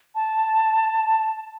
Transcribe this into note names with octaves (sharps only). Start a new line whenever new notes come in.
A5